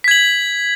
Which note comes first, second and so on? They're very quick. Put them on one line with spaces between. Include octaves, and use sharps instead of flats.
B6 G#6 F#7